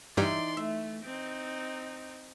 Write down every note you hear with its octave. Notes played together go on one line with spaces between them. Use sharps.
G2 E3 G3 D#4 D5 C6
A3 E5
C4 D#4